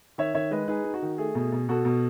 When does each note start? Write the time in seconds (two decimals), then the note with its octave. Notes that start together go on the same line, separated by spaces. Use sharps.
0.18 D#3 C#5 E5
0.35 D#3 C#5 E5
0.51 G#3 B4 D#5
0.68 D#4 G#4 B4
0.84 D#4
0.94 F#4
1.02 D#3
1.18 A3 G#4
1.35 B2
1.52 B2
1.69 B2 F#4 A4
1.85 B2